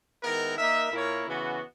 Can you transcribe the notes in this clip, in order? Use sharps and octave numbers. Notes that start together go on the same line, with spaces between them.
D#3 G#3 B3 E4 A#4
A#3 D#4 A#4 E5
A#2 A#3 E4 A#4 C#5
C#3 E3 B3 F#4